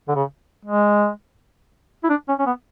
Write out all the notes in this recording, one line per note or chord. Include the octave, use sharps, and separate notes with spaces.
D3
C#3
G#3
E4
D4
C#4
C#4
B3